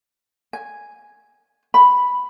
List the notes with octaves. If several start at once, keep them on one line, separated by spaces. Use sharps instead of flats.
G#5
B5